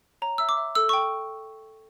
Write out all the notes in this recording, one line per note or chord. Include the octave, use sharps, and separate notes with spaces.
C#5 A#5
E5 E6
D6
E5
A4 E6
G5 C#6